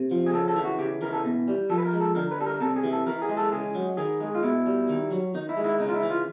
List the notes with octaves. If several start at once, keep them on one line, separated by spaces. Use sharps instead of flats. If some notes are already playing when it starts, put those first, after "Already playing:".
Already playing: C3
F3
G#4
C#3 A4
A4
E3
F#4
C#3 G4
E3 A#4
A4
B2
G3
F3 A4
B4
A#4
G#3
A4
D3 A#4
B4
G3 A4
A#4
C3 A4
G#4
E3
A4
E3 A#4
G#4
G#3
A4
C#3 G#4
F#3
D#3 G#4
G#3
F4
B2 E4
G3
D#3
F#3
D#3 D#4
E4
G#3
E4
C#3 D#4
F4
E4
E3
F4